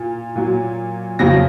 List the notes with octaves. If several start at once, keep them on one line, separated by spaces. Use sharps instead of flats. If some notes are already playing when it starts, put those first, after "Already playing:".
Already playing: A#2
A#2 F#3
F2 C#3 F#3 A#6